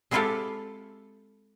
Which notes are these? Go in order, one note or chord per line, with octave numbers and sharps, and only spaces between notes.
G#3 C4 E4 F4 G4 A4